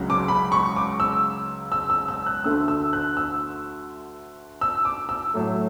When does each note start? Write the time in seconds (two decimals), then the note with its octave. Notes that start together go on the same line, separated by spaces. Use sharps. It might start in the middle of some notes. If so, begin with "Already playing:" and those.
Already playing: C#2 C#3 F#3
0.10 D6
0.28 B5
0.52 C#6
0.77 D6
1.00 E6
1.72 E6
1.90 E6
2.08 E6
2.26 F#6
2.44 D2 D3 A3 E6
2.68 E6
2.93 F#6
3.17 E6
4.61 E6
4.85 D6
5.09 E6
5.34 A2 F#3 A3